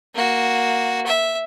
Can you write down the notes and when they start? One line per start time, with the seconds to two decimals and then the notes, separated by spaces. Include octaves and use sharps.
0.15 A#3 F#4
1.06 E5